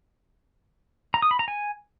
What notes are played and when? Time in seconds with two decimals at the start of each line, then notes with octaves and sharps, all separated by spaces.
1.14 A#5
1.22 D#6
1.31 B5
1.39 A#5
1.48 G#5